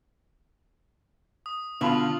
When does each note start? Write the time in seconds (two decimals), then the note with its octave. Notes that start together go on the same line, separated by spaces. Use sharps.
1.46 D#6
1.81 B2 D3 F4 B5 C#6 F#7